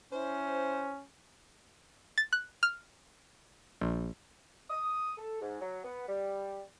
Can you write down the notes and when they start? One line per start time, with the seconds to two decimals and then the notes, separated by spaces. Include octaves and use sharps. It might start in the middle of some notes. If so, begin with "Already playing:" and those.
0.12 C#4 E4 C5
2.18 A6
2.33 F#6
2.63 F6
3.81 A#1
4.70 D#6
5.18 A4
5.41 G#2
5.60 F#3
5.84 B3
6.07 G3